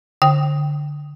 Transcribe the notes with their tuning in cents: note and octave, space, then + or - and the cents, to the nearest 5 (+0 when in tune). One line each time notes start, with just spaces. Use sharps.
D3 +0 G5 +0